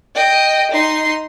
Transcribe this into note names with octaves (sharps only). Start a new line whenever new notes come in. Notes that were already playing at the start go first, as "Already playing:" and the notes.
D#5 G5
D#4 C6